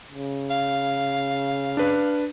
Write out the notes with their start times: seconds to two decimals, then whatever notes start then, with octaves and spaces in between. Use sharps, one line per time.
0.11 C#3
0.50 F5
1.77 D4 B4